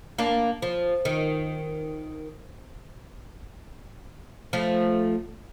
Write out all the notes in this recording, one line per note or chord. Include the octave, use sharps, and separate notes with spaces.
A#3 D4
F3
D#3
F3 A3